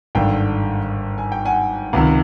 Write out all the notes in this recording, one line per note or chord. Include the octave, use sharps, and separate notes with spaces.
G#1 G2 D3 F5 G5
G#5
G5
F#5 G#5
C#2 C3 D#3